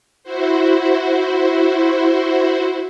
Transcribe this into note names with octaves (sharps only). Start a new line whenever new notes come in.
E4 F#4 C5